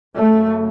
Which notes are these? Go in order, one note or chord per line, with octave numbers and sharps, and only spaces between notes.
F#2 C#3 A3